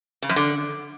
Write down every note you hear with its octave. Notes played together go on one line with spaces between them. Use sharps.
C#3
F#2
D3